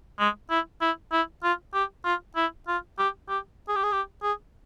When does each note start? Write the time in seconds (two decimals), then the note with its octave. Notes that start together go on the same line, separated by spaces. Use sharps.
0.19 G#3
0.50 E4
0.81 E4
1.12 E4
1.43 F4
1.74 G4
2.05 F4
2.36 E4
2.68 F4
2.99 G4
3.29 G4
3.68 G#4
3.76 G4
3.84 G#4
3.92 G4
4.23 G#4